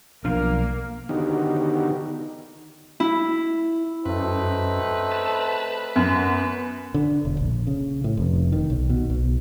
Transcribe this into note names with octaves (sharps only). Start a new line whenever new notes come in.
B1 F3 A#3 D4 F5
D3 D#3 B3 D#4 F#4 G4
E4
F#2 A3 C4 D#4 B4
A5
F#2 B3
D3
E1
A#1
C#3
A2
F1
D#3
B1
B2
B1